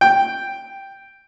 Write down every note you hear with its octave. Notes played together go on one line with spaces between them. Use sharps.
G5